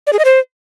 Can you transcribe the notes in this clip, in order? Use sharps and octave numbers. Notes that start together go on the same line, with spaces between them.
D5
G#4
D#5
C5